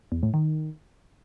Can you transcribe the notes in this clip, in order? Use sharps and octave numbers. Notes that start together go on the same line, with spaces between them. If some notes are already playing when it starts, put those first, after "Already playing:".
E2
A2
D#3